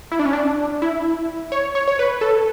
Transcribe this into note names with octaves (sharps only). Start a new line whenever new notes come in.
E4
D4
C#4
D4
E4
C#5
C#5
C#5
B4
A4